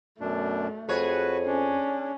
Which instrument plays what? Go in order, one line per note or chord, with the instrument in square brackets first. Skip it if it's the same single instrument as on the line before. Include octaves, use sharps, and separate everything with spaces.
[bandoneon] F#2 B2 D4 [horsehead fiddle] A3
[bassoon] F2 [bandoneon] F#4 B4 [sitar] G#4 C#5
[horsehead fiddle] C#4 [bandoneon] D4